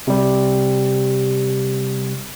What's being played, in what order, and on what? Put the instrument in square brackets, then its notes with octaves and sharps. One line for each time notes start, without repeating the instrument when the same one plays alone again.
[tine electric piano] C3 G3